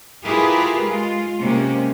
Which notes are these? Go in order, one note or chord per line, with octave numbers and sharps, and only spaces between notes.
E4 F4 G4 G#4 A#4 B4
G#3 F4
C3 G#3 A#3 C#4